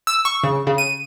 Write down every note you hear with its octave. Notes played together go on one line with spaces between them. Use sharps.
E6
C#6
C#3
C#3
D#7